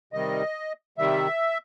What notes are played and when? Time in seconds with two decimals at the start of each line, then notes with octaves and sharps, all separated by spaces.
0.13 C3 D#3 G3 D#5
0.98 C3 D#3 G3 E5